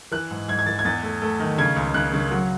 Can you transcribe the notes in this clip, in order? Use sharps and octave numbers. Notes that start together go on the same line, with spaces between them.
E3 F#6
G#2
G#2 G#6
G#6
E3 A6
G#6
E2 A6
A3
A3
D#3
C#3 G#6
C#2
C#3 F#6
C#3
F#3